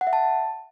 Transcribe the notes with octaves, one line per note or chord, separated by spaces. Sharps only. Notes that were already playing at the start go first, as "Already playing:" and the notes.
F#5
E5
A5